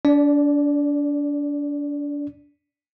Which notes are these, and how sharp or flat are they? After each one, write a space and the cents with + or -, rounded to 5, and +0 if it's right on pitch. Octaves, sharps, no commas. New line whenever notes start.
D4 -30 D5 +0